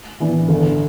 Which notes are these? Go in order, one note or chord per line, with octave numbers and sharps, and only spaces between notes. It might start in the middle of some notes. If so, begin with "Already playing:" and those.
E3 B3 D4
G1